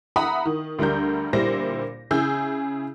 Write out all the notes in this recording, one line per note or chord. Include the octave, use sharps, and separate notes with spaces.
E5 F#5 A#5 B5 D#6
D#3
D2 D3 G3 A#4 G6
A#2 D3 G3 E4 C5 A#6
C#3 E4 G#4 E6 G6